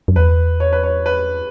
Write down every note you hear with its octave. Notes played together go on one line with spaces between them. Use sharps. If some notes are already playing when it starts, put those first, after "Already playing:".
F#2
E2 B4
C#5
B4
C#5
B4